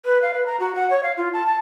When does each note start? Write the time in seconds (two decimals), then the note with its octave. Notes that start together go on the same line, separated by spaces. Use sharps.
0.05 B4
0.22 F5
0.34 B4
0.46 A#5
0.60 F#4
0.75 F#5
0.90 C#5
1.03 F5
1.17 F4
1.33 A5
1.46 A5